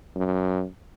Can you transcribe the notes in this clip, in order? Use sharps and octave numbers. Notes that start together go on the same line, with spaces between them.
F#2